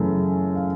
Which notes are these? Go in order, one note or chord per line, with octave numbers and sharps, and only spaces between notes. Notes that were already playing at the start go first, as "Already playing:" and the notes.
Already playing: F#2 C#3 E3 A3
F5